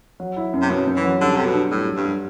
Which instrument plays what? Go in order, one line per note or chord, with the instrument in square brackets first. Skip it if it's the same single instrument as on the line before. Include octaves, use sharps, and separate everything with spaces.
[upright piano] F#3
E4
F#2
[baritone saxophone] C3
[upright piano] F#2 [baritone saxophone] B2
[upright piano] F#2
[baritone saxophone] E3
[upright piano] F#3
[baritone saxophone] D3 [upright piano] G3
[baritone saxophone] C3 [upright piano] A4
[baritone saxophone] B2
[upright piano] D4
[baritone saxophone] A2 [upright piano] G3
[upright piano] G3
[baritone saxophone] G2
[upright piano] G3